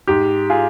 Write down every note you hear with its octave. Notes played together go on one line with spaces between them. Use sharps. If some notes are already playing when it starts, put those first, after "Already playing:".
G#2 G4
F4 G#4